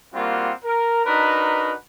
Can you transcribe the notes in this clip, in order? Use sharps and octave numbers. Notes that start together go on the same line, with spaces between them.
G3 A#3 C4 F4 F#4 F#5
A#4
D4 D#4 F#4 A#4 B4